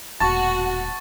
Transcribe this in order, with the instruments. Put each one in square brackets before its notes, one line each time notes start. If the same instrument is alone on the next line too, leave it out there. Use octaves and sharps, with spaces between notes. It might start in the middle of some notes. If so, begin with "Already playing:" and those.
[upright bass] E1 A#2 [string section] F#4 [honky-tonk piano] A5 [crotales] C#6 A6